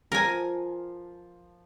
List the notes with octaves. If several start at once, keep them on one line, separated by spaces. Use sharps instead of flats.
F3 A#4 G#5